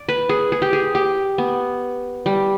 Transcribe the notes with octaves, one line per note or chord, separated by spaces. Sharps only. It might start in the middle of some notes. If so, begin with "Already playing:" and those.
Already playing: D5
B4
G#4
G#4
G4
G#4
G4
B3
G3